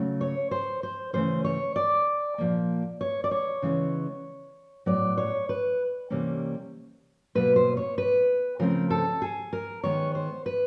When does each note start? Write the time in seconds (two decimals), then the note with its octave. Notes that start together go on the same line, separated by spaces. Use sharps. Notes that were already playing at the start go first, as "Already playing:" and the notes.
Already playing: C#3 F#3 A3
0.21 C#5
0.51 C5
0.83 C5
1.13 C#3 E3 A3 C#4 C5
1.44 C#5
1.76 D5
2.38 A#2 F3 A#3
3.01 C#5
3.24 D5
3.31 C#5
3.62 C#3 E3 G#3 B3
4.86 A2 F#3 B3 D5
5.18 C#5
5.49 B4
6.10 C3 E3 G3 A#3 C#4
7.35 B2 F#3 A#3 B4
7.56 C5
7.77 C#5
7.98 B4
8.59 C#3 F3 A3 C4 A#4
8.90 A4
9.22 G#4
9.53 A#4
9.83 D#3 G#3 B3 C#5
10.15 C5
10.46 B4